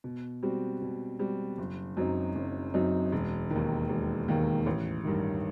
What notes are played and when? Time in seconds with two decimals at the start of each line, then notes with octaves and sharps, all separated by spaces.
0.04 B2
0.43 G3 C4 F#4
0.82 B2
1.19 G3 C4 F#4
1.58 F#1
1.97 F#2 F#3 C4 D#4
2.35 F#1
2.74 F#2 F#3 C4 D#4
3.12 E1
3.50 D#3
3.55 D#2
3.89 E1
4.28 D#2 D#3
4.66 A1
5.05 G2 D#3